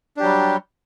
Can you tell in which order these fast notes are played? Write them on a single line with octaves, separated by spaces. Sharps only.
D4 G4 F#3 G3